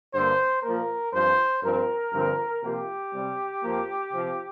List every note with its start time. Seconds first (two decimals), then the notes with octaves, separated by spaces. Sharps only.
0.13 G2 D3 A#3 C5
0.63 A#2 F3 A#3 A#4
1.12 G2 F3 C4 C5
1.63 G2 F3 C4 A#4
2.12 G2 D3 F3 C4
2.62 C3 F3 A#3 G4
3.12 C3 G3 C4
3.62 F2 F3 A#3
4.12 C3 F3 C4